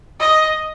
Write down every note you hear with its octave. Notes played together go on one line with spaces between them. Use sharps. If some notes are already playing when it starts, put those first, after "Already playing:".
D#5